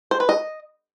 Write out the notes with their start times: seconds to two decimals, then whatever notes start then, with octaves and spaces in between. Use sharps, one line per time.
0.11 C5
0.20 B4
0.29 D#5